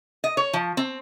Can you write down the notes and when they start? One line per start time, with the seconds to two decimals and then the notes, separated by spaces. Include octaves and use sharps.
0.24 D#5
0.37 C#5
0.53 F3
0.77 C4